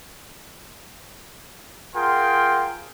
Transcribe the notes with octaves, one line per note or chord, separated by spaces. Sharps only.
F4 G#4 A#4 F#5 G5 C6